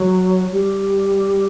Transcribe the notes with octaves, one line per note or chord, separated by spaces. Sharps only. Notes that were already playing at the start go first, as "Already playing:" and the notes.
Already playing: F#3
G3